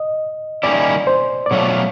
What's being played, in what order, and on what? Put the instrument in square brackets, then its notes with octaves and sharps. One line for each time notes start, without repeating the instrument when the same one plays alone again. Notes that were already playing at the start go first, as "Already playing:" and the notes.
Already playing: [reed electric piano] D#5
[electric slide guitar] D#3 G3 A#3 C#4 E4 [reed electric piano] D5
[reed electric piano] C5
D5
[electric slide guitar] B2 F#3 A3 D4 F4 [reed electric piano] C#5